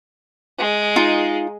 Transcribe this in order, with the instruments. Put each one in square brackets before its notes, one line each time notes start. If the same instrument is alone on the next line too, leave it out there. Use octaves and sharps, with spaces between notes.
[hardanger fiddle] G#3
[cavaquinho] D#4 F4